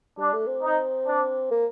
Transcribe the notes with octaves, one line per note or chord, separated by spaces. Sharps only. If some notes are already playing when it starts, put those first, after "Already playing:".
G3 D4
A3
C4
D#4
D4
A#3